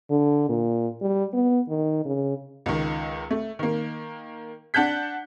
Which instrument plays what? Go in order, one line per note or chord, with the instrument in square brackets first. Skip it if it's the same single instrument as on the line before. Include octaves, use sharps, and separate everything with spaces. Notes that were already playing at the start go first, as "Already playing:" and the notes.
[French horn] D3
A#2
G3
B3
D#3
C#3
[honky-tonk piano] C#2 D#3
A3
D#3 A#3
D4 F#5 A5 F#6 G6 B6